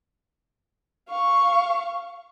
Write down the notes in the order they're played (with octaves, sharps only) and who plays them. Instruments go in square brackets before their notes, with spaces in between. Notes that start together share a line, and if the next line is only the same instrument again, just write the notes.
[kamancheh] F5 C#6